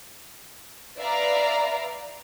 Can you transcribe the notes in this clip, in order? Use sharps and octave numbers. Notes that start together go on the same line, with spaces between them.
B4 D5 E5 F5 A#5